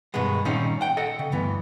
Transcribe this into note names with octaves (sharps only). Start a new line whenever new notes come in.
G2 B2 D#3 G#3 B3
A#2 D#3 G3 C4 C#4 D#4
F#5 G5
A4 D#5 F#5
C#3
D2 G2 E3 B3